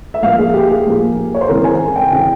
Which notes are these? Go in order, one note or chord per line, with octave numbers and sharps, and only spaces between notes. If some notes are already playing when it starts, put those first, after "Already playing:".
E5
A#2 F3 A#3 F5
G#4
G4
G#4
A#2 F3 A#3
C#5
C5
C#3 E3 G#3 C4 A#4
G#5
G5
C#3 E3 G#3 C4 G5